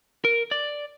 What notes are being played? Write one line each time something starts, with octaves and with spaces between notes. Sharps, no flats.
A#4
D5